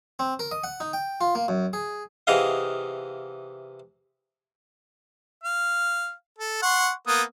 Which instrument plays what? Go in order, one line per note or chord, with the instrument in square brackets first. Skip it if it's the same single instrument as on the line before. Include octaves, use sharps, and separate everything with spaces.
[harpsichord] C4
A#4
D#5
F#5
D#4
G5
F4
A#3
F#2
G#4
C3 E3 G#4 D#5 F5 F#5
[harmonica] F5
A4
F#5 C6 C#6
A#3 B3 D#6